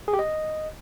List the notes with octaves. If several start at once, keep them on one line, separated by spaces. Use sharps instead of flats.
G#4
G4
D#5